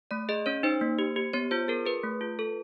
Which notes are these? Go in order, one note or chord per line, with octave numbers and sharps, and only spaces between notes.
A3 D5
G#4 D#5
C#4 C#5
D#4 C5
A#3
G4
G4
B3 C#5
F4 C5
G#4 A#4
G#4 B4
A3
F4
A4